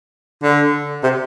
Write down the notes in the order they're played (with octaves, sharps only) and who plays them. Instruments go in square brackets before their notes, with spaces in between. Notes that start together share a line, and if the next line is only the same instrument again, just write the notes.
[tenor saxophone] D3
C3